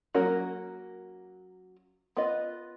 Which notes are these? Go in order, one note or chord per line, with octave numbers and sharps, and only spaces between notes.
F#3 A#3 C#4 F#4 A#4
B3 F4 B4 D#5